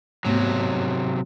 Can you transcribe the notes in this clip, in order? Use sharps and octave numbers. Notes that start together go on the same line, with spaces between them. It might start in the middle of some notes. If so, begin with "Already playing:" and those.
G#2 C3 F#3 A3 B3